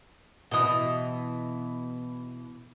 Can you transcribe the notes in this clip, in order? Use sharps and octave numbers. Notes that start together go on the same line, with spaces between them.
B2 E3 D#5 D#6